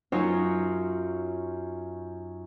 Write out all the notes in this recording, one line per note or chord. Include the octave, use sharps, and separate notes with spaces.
F#2 D#4 F4 F#4 C#5